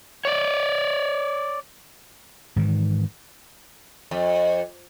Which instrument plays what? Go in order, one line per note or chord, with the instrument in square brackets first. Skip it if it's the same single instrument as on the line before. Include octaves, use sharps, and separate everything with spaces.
[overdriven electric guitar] C#5 D5
[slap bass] G#2 D#3 E3
[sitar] F2